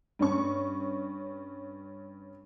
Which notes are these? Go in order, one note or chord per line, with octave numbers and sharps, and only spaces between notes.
G2 C#4 C#6